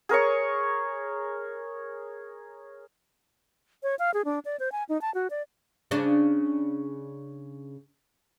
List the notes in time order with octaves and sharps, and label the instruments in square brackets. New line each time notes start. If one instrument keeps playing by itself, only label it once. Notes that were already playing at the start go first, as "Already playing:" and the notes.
[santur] G#4 A#4 C#5 C#6
[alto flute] C#5
F5
G#4
D4
D5
C5
G#5
D#4
A5
F#4
D5
[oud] C#3 D4